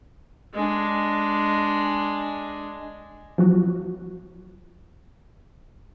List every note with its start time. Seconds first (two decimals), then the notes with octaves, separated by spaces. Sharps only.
0.54 G#3 D4
3.38 F3 F#3 F#4